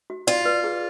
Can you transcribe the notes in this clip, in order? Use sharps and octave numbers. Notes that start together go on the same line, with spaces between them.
F#4
F4 D5
B4
G#4